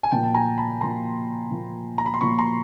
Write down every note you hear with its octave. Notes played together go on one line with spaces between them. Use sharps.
G#5
A#2 F3 A#3 G5 A5
A5
G#5 A#5
A5 B5
A#2 F3 A#3 A#5 C6
A#2 F3 A#3
A#5
B5
C6
A#2 F3 A#3 B5 C#6
A#5 C6